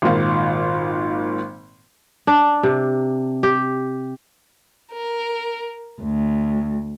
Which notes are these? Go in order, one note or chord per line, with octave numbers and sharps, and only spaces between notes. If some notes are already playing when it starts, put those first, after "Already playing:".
G#1 A#2 D#3 F5
D4
C3
G4
A#4
D2